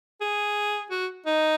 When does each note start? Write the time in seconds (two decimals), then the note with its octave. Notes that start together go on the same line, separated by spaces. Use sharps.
0.21 G#4
0.91 F#4
1.26 D#4